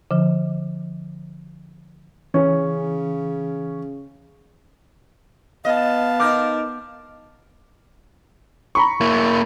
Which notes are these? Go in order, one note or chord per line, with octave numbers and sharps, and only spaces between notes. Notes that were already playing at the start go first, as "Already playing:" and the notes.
D3 F3
C#3 E3 C#4
B3 D#5 F5 A5
D#4 A#4 D6 F6 G6
A#5 B5 C#6
A#3 E4